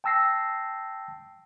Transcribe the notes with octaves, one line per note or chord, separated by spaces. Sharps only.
G5 A5 E6 A#6 C7